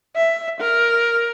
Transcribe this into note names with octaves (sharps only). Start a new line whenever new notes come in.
E5
A#4